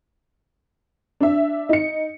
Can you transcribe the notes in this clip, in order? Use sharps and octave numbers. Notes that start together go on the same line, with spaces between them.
D4 E5
D#4 C#7